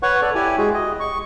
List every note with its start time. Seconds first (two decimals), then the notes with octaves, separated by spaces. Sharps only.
0.03 B4 C#5 F#5 C#6
0.21 A4 D5
0.35 E4 G4 G#5
0.58 G#3 F#4 G#4
0.74 D#5
1.00 C#6